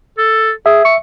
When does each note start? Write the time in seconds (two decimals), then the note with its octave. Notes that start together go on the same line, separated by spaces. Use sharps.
0.18 A4
0.66 G#4 E5
0.85 C#6